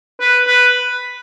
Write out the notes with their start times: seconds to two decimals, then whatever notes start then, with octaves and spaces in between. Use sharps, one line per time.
0.20 B4
0.47 B4